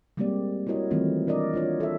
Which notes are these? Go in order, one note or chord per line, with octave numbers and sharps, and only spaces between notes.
G3 G#3 A#3 C4 G4 D5
E4 F#4 A#4 C#5 D#5
D#3 E3 G3 A3 C4 F4
D4 A#4 D5 D#5
D4 F4 C#5
A4 E5